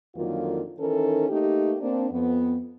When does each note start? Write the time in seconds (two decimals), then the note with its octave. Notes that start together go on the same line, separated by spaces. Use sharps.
0.15 F2 D3 D#3 F#3 A#3 F4
0.79 D#3 E3 C#4 D#4 A4 A#4
1.29 A3 A#3 D#4 G4
1.80 A#3 C4 D4
2.10 F2 B3